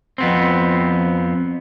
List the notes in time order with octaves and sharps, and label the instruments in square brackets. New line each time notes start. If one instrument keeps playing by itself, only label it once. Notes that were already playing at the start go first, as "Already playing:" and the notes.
[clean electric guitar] F2 B3 C4